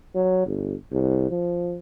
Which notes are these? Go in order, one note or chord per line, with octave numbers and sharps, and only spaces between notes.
F#3
G1
C2
F3